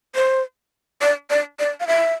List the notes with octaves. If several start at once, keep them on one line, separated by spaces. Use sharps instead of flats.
C5
D5
D5
D5
F5
E5